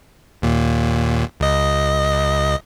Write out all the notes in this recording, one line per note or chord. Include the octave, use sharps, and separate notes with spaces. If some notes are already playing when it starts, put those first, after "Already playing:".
D#2 A#2
C#2 D#5